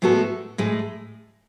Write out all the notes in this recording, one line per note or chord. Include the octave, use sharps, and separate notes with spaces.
A2 G#3 B3 F#4 A4
A2 G#3